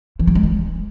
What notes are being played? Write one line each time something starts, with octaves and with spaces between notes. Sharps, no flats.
E3
G3
G#3
E3